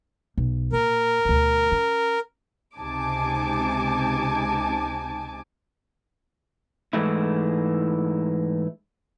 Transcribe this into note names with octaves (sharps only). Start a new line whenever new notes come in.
B1
A#2 A#4
D2 B2
C#4
C#2 C3 D#4 G#5 A5 D6
G#2 E3 G#3 A3 E4